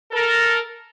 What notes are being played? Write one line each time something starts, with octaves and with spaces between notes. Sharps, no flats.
A4 A#4